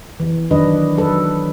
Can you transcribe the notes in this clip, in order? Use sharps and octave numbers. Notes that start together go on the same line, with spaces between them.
E3
D#3 F#3 D4 B4 D#5
F#3 A4 B4